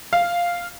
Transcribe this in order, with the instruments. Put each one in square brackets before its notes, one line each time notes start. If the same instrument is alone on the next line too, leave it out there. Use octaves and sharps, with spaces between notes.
[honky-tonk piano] F5